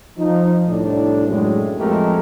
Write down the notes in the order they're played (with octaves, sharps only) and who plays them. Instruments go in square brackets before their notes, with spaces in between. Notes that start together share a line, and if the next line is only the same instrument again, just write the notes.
[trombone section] F3 D#4
C2 A2 D4
F#2 A2 G#3
F2 F3 G#3 A3 G4 A#4